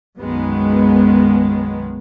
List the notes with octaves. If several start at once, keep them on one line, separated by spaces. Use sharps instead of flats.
B1 F#2 D#3 G#3 B3